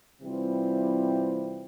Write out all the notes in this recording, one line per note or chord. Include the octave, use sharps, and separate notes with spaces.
C3 E3 G3 C4 F4